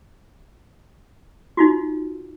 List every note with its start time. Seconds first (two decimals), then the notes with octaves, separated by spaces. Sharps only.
1.57 D#4 F4 F#4